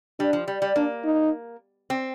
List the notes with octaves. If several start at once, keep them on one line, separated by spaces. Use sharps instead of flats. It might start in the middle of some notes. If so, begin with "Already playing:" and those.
G3 D4
F3
G3
G3
A#3 D4
D#4
C4